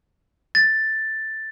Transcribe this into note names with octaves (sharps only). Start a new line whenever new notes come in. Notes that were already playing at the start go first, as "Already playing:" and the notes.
A6